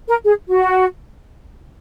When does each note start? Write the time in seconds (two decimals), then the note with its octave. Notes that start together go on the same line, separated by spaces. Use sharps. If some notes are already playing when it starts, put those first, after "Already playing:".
0.09 A#4
0.24 G#4
0.48 F#4